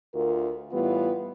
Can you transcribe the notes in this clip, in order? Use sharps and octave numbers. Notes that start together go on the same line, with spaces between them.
D2 F4 A#4
A2 E3 G3 B3 F4